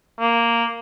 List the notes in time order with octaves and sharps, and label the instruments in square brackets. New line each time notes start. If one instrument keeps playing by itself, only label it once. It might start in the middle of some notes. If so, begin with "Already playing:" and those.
[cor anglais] A#3